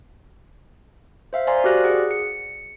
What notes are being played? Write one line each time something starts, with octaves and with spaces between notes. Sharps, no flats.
C5 E5 F5
C5 D5 F5 G#5 A#5 C6
F#4 G4 A#4 D5 F#6 A#6
G#4 F#5
C#7